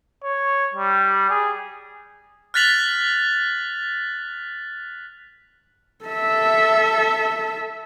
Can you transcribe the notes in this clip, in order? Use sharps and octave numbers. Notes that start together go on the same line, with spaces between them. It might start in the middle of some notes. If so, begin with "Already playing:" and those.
C#5
G3
G#4
F6 F#6 A6 B6 F7 F#7
A4 E5